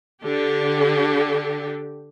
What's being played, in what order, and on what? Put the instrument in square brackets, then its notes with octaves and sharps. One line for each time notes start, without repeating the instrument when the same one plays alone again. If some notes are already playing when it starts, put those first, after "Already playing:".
[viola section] D3 G4